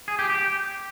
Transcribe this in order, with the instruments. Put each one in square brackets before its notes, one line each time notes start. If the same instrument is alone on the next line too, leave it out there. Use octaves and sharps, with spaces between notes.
[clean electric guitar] G#4
G4
G4